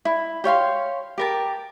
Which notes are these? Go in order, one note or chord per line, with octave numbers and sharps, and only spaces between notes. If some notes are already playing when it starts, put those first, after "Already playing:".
E4
G4 C#5 F5 C6
G4 A#4 A5